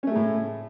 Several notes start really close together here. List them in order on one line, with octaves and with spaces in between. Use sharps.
C#4 A3 G#3 A2